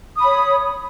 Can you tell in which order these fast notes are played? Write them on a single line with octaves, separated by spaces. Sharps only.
D#6 B5 C#5